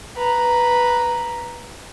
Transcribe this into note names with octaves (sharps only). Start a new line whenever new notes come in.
B4 A#5